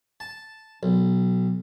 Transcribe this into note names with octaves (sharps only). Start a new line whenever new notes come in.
A5
B1